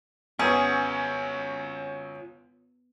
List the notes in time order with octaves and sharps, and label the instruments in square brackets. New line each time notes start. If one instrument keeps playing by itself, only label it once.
[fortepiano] F#2 C#4 [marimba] B3 B4 F#5 [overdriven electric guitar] F4 C#5 [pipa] G#4